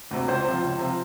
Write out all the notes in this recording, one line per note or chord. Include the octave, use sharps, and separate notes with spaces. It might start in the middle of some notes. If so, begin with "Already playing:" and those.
D2 C3
C#2 C5
C3 F3
C#2
C3 F3